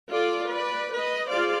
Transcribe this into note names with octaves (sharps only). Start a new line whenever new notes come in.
F4 A4 D5
B4 D5
B4 D#5
F4 G#4 C5 D5 F5